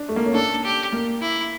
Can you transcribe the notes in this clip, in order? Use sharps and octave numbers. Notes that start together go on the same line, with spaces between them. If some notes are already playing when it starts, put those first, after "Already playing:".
Already playing: D4
A3
A#3
C#4
D4 A4
G4
A#3
E4